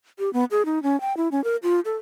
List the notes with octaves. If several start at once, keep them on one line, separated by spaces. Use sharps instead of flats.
G4
B3
G#4
D#4
C#4
G5
E4
C#4
A#4
F4
A4